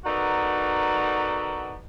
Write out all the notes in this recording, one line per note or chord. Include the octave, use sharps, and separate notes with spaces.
B3 D#4 F#4 A4 A#4 D5